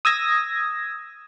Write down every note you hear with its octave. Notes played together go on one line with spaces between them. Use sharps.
D#6 E6 G#6 A#6